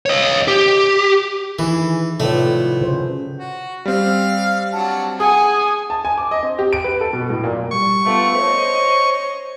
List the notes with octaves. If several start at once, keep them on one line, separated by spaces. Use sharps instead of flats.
C#5 D#5
G4
D#3 E3 G#4 B4
A2 C3 F3 F#3 A3 B4 D5
C#3 G#4 C5
F#4
G3 C4 F5
F#3 D4 F#5 A5
G#4 F#5 G#5 D#6
A5
G#5
D6
D#5
C4
G4
D7
B4
A4
B2
A2
A#2
G3 C#6
A3 B3 F4
C5 C#5 D#5